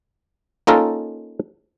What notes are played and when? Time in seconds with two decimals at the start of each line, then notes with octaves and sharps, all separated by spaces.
0.67 A#3 C#4 D#4 F4 A4 A#4